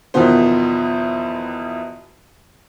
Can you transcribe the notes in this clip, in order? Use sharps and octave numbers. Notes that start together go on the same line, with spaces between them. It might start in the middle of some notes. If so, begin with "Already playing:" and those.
E2 B2 D#3 F3 B3 C5